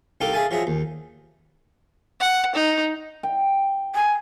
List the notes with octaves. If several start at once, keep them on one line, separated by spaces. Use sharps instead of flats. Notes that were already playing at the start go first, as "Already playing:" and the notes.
C2 D#4 G4 A4 F5 D6
G#4 E5 F5 G#5 A5
F3 F#3 G#4 E5
D#2
F#5
D#4
G5
G#5